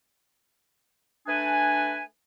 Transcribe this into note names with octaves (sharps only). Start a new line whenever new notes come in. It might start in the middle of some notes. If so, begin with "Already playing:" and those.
A3 D4 B4 G#5